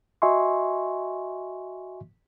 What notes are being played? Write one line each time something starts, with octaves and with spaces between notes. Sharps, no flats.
F#4 D#5 E5 G#5 C6 C#6